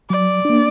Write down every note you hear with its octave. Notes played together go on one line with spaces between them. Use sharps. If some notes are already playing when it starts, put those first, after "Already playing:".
F#3 D5
A#3 D4